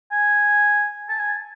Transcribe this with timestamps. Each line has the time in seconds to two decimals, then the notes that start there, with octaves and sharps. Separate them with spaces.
0.11 G#5
1.08 A5
1.19 G#5